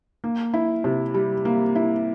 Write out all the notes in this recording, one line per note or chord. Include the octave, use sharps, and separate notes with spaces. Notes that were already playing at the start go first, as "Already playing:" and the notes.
A#3
E4
C3
G3
A#3
E4